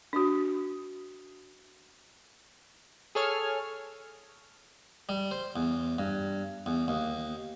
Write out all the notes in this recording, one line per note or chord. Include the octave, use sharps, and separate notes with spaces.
D4 F#4
G#4 A4 C#5 F6
G3
C5
E2
G2
E2
D#2